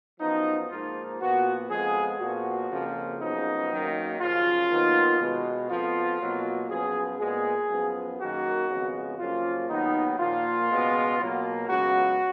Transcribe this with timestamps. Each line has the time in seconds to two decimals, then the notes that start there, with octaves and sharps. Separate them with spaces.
0.20 F#2 F3 B3 D#4
0.70 G#2 F3 A#3 F4
1.20 A#2 F3 B3 F#4
1.70 F2 F3 G#3 B3 G#4
2.19 A#2 F3 B3 F#4
2.70 F2 C#3 F3 A#3
3.20 F#2 C#3 F3 G#3 B3 D#4
3.70 F#2 D#3 F#3 A#3
4.20 F#2 C#3 F3 F4
4.70 D#2 D#3 F#3 B3
5.20 B2 G#3 B3
5.70 F2 F3 B3 F4
6.20 B2 F#3 A#3
6.70 F#2 F3 B3 G#4
7.19 A#2 G#3 B3 G#4
7.70 F#2 F3 B3
8.19 F#2 D#3 A#3 F#4
8.70 F2 C#3 G#3 B3
9.19 F#2 C#3 F3 A#3 F4
9.69 D#2 D#3 F#3 B3 D#4
10.19 A#2 F3 A#3 F4
10.70 C#2 B2 G#3 B3
11.19 B2 F#3 A#3
11.69 C#2 C#3 F#3 B3 F#4